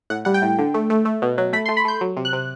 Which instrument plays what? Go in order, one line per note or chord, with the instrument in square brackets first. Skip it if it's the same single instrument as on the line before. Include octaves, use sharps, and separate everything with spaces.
[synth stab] A2 F#5
G3 F#5
G5
A2
D3
A3
A3
A3
B2
F#3
A3 B5
C6
A3
B5
A3 G6
F#3
C3
F#6
C3